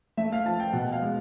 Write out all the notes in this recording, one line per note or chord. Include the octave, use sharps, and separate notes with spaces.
A3 E5
F5
F3 A5
G5
B2 F#5
F5
G#3